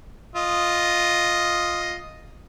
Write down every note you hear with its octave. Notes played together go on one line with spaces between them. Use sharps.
F4 D#5